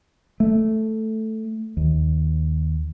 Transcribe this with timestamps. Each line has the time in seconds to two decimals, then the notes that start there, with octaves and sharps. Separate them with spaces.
0.40 A3
1.77 D#2